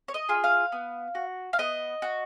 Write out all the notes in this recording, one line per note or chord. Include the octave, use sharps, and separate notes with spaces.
C#5
D#5
F4 G#4
F5
B3
F#4
F5
B3 D#5
F#4